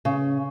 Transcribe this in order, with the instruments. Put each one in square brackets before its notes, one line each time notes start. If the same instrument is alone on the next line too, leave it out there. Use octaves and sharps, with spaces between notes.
[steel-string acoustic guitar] C#3